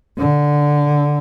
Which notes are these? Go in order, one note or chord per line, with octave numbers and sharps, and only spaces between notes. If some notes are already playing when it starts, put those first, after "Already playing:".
D3